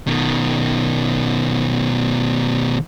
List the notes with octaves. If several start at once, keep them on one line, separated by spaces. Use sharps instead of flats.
B2 D#3